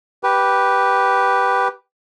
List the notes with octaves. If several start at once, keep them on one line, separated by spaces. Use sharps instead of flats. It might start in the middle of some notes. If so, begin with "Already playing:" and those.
G4 B4